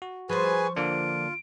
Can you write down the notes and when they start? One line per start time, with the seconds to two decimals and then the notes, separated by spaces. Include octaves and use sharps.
0.02 F#4
0.29 F3 G#4 B4 C5 G#5 C#6
0.76 D3 A#3 D4 F4 D7